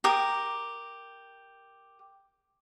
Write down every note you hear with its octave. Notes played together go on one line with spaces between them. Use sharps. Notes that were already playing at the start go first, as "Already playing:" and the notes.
G4 A#4 D#6